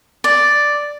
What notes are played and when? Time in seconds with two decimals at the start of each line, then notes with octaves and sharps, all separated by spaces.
0.24 D5